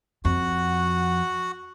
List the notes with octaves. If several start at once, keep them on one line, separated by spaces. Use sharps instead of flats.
F2 F#4 F#5